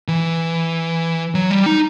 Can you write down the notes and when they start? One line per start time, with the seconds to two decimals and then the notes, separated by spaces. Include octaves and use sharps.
0.08 E3
1.35 F#3
1.50 G3
1.66 D#4